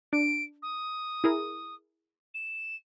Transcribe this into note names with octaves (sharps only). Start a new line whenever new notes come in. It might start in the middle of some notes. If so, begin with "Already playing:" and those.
D4 D7
D#6
E4 G#4 A#4
E7